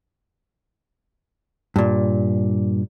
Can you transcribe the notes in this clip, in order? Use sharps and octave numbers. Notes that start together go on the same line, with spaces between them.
G2 A#2